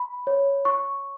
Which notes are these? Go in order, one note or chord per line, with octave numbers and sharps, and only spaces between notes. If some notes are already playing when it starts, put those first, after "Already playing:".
Already playing: B5
C#5
C#6